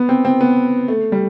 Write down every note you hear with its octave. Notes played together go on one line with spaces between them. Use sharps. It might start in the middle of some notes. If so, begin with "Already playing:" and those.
Already playing: B3
C4
C4
B3
A3
G3